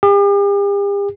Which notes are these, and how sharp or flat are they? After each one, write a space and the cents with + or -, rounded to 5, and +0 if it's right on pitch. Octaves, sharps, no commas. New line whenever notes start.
G4 +45